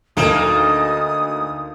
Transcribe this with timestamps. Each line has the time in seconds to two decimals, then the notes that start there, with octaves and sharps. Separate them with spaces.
0.17 D2 A#3 D#4 A4 A#4 D#6 E7